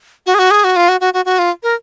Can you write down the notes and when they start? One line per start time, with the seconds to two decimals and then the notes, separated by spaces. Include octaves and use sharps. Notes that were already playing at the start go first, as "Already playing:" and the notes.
0.26 F#4
0.34 G#4
0.39 F#4
0.51 G#4
0.64 F#4
0.76 F4
0.88 F#4
1.00 F#4
1.14 F#4
1.25 F#4
1.39 F4
1.63 A#4